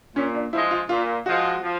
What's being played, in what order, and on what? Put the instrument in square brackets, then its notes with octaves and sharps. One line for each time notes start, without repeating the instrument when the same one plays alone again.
[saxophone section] A#2 [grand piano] C#4
[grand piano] D4
[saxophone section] F3 [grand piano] E4
[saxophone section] G#3
[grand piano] F4
[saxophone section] A#2 [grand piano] F4
[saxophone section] F3 G#3 [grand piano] F#4
[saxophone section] F3